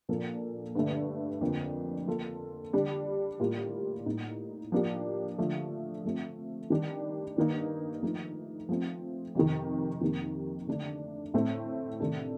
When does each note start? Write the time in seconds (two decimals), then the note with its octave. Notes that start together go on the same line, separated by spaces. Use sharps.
0.09 A#2 F3 A#3 D4 A4
0.75 G2 D3 A3
1.41 F2 D3 F3 A#3
2.07 F3 A#3 F4 A4
2.73 D3 G3 D4
3.40 A2 G3 A#3 F4
4.06 A2 G3 A#3 D#4
4.72 F3 A#3 D4 G4
5.38 D3 F3 A3
6.05 F3 A3 C4
6.70 D#3 G3 D4 G4
7.36 G2 D#3 A#3 D#4
8.03 F3 A3 D#4
8.69 F3 A3 C4
9.35 F2 C3 D#3
10.01 F2 D#3 A#3 D#4 G4
10.67 D3 A3 D4
11.34 A2 A3 C4
12.00 C3 D#3 A3 D4 A4